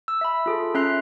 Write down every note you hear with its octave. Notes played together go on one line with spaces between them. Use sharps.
E6
E5 B5
F4 G#4 A4
C#4 E5 A#5 C6 F#6 C7